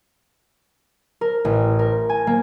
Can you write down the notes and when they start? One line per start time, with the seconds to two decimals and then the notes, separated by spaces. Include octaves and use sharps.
1.21 A#4
1.45 A1
1.79 A#4
2.09 G#5
2.27 A#3